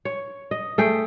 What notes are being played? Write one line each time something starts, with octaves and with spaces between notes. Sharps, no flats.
C#5
D#5
A3 G#4 G5